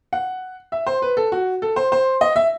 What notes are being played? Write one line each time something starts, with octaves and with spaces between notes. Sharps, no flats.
F#5
E5
C5
B4
A4
F#4
A4
C5
C5
D#5
E5